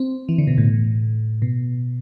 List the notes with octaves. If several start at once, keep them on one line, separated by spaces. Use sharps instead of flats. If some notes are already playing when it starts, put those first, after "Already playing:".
Already playing: C4
E3
D3
B2
A2
B2